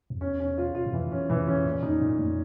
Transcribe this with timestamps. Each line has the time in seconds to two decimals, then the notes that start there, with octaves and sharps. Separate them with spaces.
0.10 F2
0.21 E2 C#4
0.40 C#4
0.58 F4
0.75 F4
0.86 F#2
0.93 F2 E3
1.07 F2
1.11 F#2 C#4
1.29 F2 E3
1.47 F2 C#4
1.65 E2 A#2
1.83 F2 D#4
2.00 F#2 A#2
2.19 F2 A#2